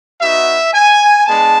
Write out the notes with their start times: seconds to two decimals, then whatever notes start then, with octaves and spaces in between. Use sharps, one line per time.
0.20 B3 D#4 F#4 E5
0.73 G#5
1.26 G#3 B3 D4 A5